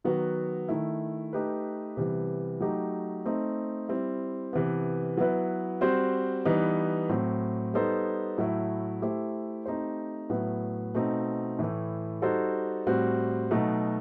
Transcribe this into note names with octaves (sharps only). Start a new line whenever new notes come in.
D#3 F#3 B3 F#4
D#3 A3 E4
A3 D#4 G4 B4
C3 E3 G3 B3
F#3 A3 D#4 G4
A3 C4 D#4
G3 C4 E4
C3 E3 B3
F#3 B3 E4 B4
G3 C4 F#4 C5
E3 G3 B3 D#4
A2 F#3 C4
G3 B3 D#4 A4 C5
A2 F#3 A3 E4
A3 E4 G4 C5
A3 C4 D#4 G4 C5
A2 F#3 B3 E4
B2 A3 C4 D#4
A2 E3 A3
G3 D#4 F#4 A4 C5
A2 G3 C4 F#4
B2 F#3 A3 D#4